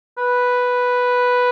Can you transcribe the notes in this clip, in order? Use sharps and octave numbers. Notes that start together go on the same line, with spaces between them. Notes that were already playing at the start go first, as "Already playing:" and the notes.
B4